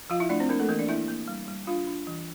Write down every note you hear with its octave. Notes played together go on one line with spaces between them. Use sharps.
F3 F4 F5
E4 E5
A3 D4 D5
C4 C5
A#3 D4 A#4
A3 A4
E3 A#3 A#4
D4 D5
A#3 E4 E5
A#3
G3
G3
D4 F4 F5
D4
E3